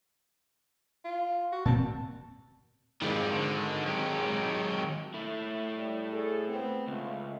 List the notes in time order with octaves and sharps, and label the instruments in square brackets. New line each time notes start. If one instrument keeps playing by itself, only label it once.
[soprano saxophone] F4
F#4
[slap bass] A#2 C4 [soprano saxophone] A5
[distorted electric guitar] F2 G3 [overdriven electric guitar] D#3 G#3
[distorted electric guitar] D3
F#3 G4
[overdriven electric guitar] A3 E4
[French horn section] G3
G#4 A4
B3 C4
[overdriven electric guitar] C#2 [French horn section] A3